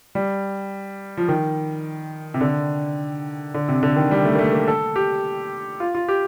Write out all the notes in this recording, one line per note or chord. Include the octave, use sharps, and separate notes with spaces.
G3
F3
D#3
C3
D3
D3
C3
D3
D#3
G3
A3
A#3
A3
A#3
A4
G4
F4
F4
G4